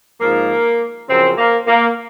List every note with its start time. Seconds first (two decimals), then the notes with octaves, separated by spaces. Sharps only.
0.21 G#2 F3 A#3
1.09 F#2 C#3 F3 C4
1.38 A#3
1.67 A#3